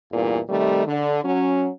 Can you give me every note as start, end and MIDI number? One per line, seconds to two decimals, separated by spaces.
0.12 0.39 40
0.12 0.39 43
0.12 0.39 46
0.12 0.39 52
0.49 0.85 48
0.49 0.85 51
0.49 0.85 55
0.49 0.85 57
0.86 1.21 50
1.23 1.68 54
1.23 1.68 61